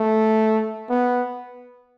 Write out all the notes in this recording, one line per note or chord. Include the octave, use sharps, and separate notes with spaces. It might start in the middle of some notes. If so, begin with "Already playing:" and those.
Already playing: A3
B3